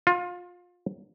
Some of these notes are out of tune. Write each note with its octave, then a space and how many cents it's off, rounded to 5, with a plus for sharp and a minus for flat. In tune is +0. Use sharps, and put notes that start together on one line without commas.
F4 +25